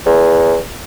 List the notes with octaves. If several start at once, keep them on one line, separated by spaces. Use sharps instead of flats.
E2